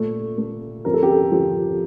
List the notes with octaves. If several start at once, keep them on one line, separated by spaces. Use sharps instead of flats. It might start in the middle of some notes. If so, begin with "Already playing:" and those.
Already playing: A#2 A3
A3
F2 A#4
A4
G4
A4
F3